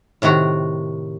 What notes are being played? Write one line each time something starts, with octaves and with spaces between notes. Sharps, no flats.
A2 C3 D#3 F#4 A#5